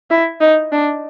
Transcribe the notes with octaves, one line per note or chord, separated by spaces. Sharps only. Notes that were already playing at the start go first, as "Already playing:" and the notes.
E4
D#4
D4